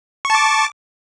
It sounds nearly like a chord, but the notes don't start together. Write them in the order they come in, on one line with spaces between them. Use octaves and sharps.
C#6 A5 D6